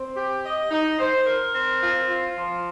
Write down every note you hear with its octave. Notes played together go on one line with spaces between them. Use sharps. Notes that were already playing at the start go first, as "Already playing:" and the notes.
Already playing: C4
G4
D#5
D#4
C5
A#4
C4
F4
F4
F3